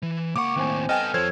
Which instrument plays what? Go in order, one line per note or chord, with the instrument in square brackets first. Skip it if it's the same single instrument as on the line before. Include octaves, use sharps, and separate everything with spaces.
[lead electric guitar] E3
[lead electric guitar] C#2 F#5 [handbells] A#3 C#6 [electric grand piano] D6
[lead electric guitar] D#2 A2 [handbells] C4 C5 G#5
[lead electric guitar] B3 A4 [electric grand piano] D#5 G5 G#5 [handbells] F6
[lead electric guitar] F2 F3 [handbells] A4 C#5 G#6 [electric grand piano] C5